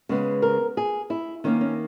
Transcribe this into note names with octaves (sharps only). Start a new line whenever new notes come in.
C#3 G#3 B3
A#4
G#4
E4
D#3 A#3 C#4
C#4